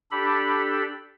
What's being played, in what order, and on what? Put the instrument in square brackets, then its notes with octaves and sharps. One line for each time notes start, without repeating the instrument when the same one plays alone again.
[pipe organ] D4 G4 A4 B5